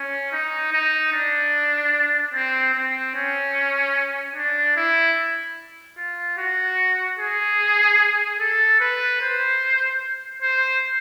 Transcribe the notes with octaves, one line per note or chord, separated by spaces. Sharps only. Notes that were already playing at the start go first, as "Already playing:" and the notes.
Already playing: C#4
D#4
D#4
D4
C4
C4
C#4
D4
E4
F4
F#4
G#4
A4
B4
C5
C5